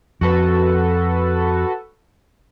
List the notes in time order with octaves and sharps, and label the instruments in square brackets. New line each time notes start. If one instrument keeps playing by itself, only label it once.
[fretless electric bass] F2 [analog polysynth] F#4 A4 B4